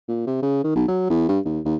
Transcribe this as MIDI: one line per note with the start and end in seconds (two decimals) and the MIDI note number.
0.09 0.25 46
0.27 0.40 48
0.42 0.64 49
0.64 0.71 51
0.75 0.84 35
0.88 1.05 54
1.10 1.28 40
1.29 1.39 43
1.45 1.60 39
1.65 1.76 39